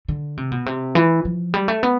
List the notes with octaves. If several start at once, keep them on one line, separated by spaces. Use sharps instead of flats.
D3
C3
B2
C3
E3
F3
G3
A3
B3